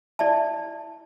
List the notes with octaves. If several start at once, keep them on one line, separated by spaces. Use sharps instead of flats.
E4 D5 E5 A5